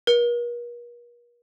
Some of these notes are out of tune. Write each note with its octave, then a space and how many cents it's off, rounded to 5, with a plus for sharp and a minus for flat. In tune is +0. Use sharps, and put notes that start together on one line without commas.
A#4 +45